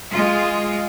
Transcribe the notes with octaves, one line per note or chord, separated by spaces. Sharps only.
G#3 F4